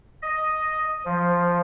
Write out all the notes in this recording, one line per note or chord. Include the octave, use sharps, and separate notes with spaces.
D#5
F3